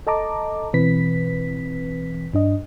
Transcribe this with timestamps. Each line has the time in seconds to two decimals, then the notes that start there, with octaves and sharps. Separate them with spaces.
0.07 A4 D#5 A5 A#5 D6
0.73 B2 E3 C4 B4 B6
2.34 G2 D4 D#5